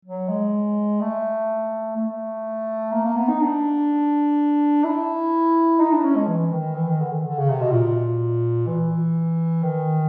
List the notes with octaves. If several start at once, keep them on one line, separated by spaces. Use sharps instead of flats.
F#3
G#3
A3
A3
A#3
A#3
B3
D#4
D4
E4
D#4
D4
C#4
G#3
E3
D#3
E3
D#3
D3
D#3
D3
C#3
C3
B2
A#2
E3
D#3